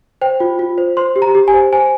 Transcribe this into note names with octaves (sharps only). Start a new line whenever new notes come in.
C5 G5
F4
F4
C5
C5 C6
G4
A#5
G4
G#5
C5
C5 G#5